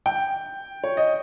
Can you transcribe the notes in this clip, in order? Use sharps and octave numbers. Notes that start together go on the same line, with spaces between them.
G5
C#5
D#5